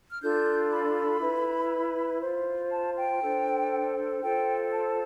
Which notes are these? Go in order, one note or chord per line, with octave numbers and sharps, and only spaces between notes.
F6
D4 F4 A4 G6
B5
E4 B4
F4 C5
A5
G5
D4 A4 C5
F4 A4 C5 G5
A5